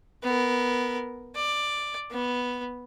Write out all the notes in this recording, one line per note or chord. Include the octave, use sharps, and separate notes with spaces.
B3 A#4
D5
B3